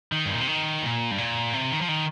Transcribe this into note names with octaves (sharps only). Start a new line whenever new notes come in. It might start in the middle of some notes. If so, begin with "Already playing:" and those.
D#3
G2
A#2
C3
D#3
A#2
G2
A#2
C3
D#3
F3
D#3